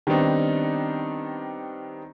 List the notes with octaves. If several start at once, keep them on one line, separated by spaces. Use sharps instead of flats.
D#3 G3 B3 C4 D4 D#4